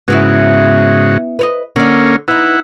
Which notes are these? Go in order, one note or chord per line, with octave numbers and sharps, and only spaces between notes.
G#2 C#3 B3 C#4 E4 F#4
B4 C#5 D#5
D3 A#3 C#4 D5
B3 D#4 E4 F#5